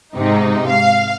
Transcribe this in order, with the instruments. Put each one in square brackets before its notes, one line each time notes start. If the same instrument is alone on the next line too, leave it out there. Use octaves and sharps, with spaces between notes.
[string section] G#2 C3 D#4
F5